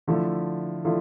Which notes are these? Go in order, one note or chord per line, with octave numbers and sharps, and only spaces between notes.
D3 F3 A3 E4
D3 F3 A3 E4